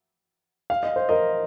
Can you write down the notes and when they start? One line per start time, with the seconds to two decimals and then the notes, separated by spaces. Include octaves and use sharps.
0.70 F5
0.83 D#5
0.96 C5
1.09 A#4 D#5